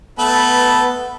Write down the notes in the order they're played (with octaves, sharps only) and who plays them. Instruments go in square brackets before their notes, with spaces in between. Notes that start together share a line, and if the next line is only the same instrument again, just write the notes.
[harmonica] A3 A4 B4 [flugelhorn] B3